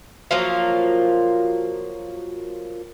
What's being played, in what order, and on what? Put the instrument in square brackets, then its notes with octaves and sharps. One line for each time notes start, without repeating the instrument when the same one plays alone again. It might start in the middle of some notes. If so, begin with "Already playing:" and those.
[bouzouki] F3 F#3 A#3 F4